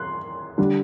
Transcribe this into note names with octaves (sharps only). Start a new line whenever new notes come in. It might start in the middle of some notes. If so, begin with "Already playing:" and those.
Already playing: C6 F#6
D3 G3 D4